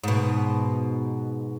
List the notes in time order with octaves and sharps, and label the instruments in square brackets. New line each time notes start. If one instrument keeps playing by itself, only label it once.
[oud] G#2 B2